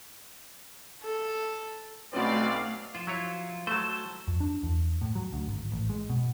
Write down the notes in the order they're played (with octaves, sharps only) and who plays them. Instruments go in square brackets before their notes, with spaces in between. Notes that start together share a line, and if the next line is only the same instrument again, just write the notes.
[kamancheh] A4
[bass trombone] B1 [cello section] A3 F5 [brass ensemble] C4 B4 D5 [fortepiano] C#4 F#4
[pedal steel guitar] F3 F4
[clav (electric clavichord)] F#3 E4 C#5
[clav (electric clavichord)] F#3 A3 [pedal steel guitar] C5 A5
[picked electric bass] F2
D4
E2
A2
F#3
D2
G#1
A1
G#3
B2